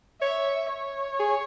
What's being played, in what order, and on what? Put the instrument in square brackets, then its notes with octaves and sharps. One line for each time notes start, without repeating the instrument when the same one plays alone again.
[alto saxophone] C#5 [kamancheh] E5
[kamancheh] C#5
[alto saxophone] G#4